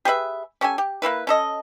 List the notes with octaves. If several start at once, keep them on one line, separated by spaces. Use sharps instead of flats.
G4 G#4 B4 E5
C#4 G4 A4 G#5
G4
A#3 C4 E4 B4
C#4 A4 D#5